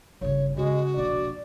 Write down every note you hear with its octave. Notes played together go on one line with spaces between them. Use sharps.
G1 C#3 C#5
C#3 G#3 F#4
E1 A#1 D5